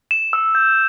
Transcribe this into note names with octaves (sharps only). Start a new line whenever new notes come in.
E7
E6
G6